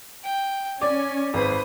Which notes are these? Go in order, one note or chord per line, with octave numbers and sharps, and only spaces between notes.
G5
C#4 D5 G#5
G#1 B4 C5 D#6